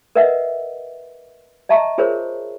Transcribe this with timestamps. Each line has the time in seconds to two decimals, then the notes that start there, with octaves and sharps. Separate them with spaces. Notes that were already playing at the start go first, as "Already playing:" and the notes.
0.15 A#4 B4 D#5 E5 F#5
1.69 D#5 E5 A5 A#5 C#6
1.98 F4 G#4 A#4 C5 C#5